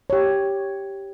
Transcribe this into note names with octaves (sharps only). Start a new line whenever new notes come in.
G4 C#5